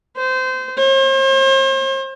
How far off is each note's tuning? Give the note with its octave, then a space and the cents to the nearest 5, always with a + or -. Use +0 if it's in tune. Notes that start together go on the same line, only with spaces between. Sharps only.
C5 -25
C5 +40